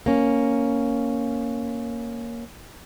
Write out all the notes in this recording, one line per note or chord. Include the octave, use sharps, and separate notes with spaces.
A#3 C#4